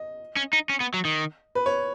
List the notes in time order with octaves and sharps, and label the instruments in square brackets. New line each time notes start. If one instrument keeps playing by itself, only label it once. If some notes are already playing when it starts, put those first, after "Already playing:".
Already playing: [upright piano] D#5
[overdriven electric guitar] C#4
D#4
C#4
B3
F#3
D#3
[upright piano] B4
C#5